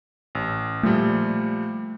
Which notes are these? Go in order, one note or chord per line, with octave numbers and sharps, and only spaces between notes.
A1
A#2 F3 G3 A3